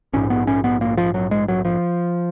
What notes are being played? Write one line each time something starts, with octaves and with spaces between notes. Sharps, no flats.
A#1 G#2 C#4
B3
C#4
B3
A#3
F3
F#3
G#3
F#3
F3